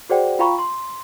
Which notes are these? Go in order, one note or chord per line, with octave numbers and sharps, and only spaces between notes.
F#4 G#4 C5 D5 F#5 G5
F4 F5 G5 A#5 B5 C#6
C6